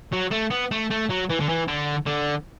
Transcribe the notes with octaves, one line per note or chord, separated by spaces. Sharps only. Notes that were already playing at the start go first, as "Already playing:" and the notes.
F#3
A3
B3
A3
A3
F#3
E3
D3
E3
D3
D3